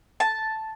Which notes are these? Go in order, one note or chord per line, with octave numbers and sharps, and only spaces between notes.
A5